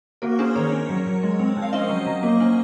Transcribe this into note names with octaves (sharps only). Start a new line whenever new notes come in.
A#3 F#4 A#4
C#4 G#4 C5
D#3 A#4 C#5
C#4
F#3
F#3
G#3
C4
F3
F5
C#4 C5 D#5
F#3
F#3
A#3
C#4